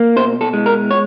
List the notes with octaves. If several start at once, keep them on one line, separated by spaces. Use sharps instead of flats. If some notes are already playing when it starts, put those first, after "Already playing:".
Already playing: A#3
B2 C5
A4
G#3
A#4
C#5